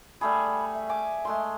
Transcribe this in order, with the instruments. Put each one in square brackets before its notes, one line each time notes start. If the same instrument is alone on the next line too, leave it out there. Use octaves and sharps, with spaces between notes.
[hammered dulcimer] G3 A3 G#4 [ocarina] B5
[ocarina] E5
[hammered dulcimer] G#5 D6
G#3 A3 C6